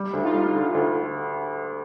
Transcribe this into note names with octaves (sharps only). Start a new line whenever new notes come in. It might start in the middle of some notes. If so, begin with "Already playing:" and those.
Already playing: G3
D2
D#4 F4
G3
D3
D2